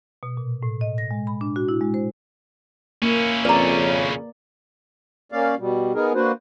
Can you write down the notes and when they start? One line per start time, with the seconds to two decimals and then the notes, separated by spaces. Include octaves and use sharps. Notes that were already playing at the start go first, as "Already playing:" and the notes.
0.23 B2
0.37 A#2
0.63 A2
0.81 D#5
0.98 A#6
1.11 G#3
1.27 B5
1.41 D4
1.56 F#4
1.69 E4
1.81 G#3
1.94 C5
3.02 A#3 C#4 E4
3.45 F2 C#3 B4 D5 A#5
5.32 A#3 C#4 D5 F5
5.59 B2 G3
5.94 B3 D#4 G#4 A#4
6.15 A#3 D4 F#4 B4 C5